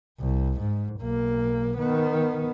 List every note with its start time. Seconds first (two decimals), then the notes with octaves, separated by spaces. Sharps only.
0.20 C2
0.60 G#2
1.01 B1 A#3
1.78 D#3 B3